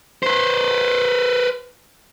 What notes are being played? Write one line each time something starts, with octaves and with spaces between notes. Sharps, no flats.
B4 C5